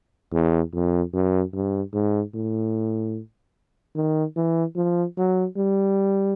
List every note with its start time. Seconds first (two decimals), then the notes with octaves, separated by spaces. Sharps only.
0.33 E2
0.74 F2
1.14 F#2
1.54 G2
1.93 G#2
2.34 A2
3.96 D#3
4.36 E3
4.76 F3
5.17 F#3
5.57 G3